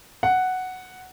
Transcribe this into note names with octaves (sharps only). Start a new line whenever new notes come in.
F#5